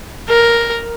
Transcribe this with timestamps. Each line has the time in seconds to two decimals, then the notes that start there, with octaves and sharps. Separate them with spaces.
0.29 A#4